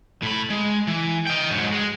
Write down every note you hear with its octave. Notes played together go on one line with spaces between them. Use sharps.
A2 B5
G#3
E3
D#5 G5
G#2 F#3
G#3